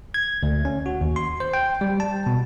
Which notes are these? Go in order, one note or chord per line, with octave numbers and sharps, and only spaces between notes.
G#6
D2
C#4
F#4
D#2
C6
C5
G5
G3
A5
B2